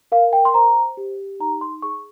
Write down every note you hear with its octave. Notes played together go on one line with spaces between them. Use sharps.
A#4 F5
G5
C6
C5 A#5
G4
D#4 A#5
C6
G#4 C#6